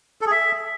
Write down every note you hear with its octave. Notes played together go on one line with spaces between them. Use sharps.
A4
G#4
E5